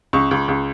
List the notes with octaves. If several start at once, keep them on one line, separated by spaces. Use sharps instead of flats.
C#2 C#6
C#2
C#2